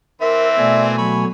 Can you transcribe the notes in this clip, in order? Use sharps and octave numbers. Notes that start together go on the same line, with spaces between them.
E3 C4 A#4 E5
B2 A3 D5 G#5
F#3 C#5 B5